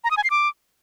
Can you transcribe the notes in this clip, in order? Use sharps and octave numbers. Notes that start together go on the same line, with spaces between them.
A#5
D#6
G#5
C7
D6